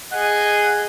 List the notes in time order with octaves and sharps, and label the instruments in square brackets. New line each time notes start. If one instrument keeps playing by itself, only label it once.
[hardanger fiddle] G#4 D#5 [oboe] F#5